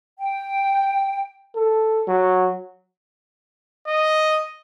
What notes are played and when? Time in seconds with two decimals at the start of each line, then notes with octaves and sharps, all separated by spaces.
0.18 G5
1.55 A4
2.08 F#3
3.87 D#5